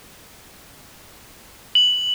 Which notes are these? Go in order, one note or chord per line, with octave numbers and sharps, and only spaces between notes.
F#7